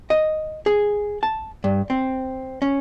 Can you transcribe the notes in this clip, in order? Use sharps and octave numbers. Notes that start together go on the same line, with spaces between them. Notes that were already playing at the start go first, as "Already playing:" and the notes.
D#5
G#4
A5
G2
C4
C#4